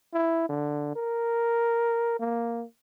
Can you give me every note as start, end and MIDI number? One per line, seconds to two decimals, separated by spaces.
0.14 0.45 64
0.49 0.93 50
0.96 2.15 70
2.20 2.65 58